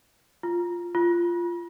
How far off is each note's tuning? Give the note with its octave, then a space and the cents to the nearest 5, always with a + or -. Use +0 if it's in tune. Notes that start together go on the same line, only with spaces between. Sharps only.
F4 +0
F4 -15